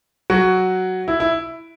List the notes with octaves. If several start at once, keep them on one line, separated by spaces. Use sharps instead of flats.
F#3 F#4
E4
E4